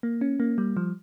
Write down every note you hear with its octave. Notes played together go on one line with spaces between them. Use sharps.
A#3
C#4
A#3
G3
F3